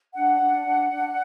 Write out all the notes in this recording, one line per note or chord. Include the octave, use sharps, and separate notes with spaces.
D4 F#5
D4
D4
D4